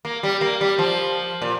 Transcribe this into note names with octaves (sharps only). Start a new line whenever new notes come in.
A#3
G3
A#3
G3
F3
A#2